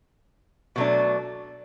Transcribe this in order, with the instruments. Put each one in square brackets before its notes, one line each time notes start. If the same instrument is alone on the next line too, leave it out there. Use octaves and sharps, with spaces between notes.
[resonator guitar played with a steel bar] B2 F#3 A3 D4